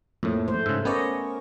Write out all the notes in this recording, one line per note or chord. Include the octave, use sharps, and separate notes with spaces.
F2 A2 A3 A#3
A3 C5
G#2 C#3 E6 F#6
B3 C#4 G#4 A#4 C5 D5 D#5 C#6